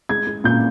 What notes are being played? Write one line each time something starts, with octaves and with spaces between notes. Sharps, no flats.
G#3 G#6
G#3
A#2 G6